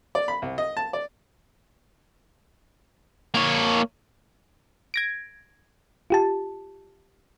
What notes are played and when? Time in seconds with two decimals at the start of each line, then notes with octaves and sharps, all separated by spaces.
0.15 D5
0.28 B5
0.42 C2
0.58 D#5
0.77 A5
0.93 D5
3.34 A#3 C#5
4.94 G#6 A#6 D7
6.10 F4 G4 A5